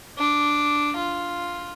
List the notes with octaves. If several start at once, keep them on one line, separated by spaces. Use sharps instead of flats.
D4
F4